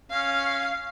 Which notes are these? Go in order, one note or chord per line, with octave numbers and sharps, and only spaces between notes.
C#4 F5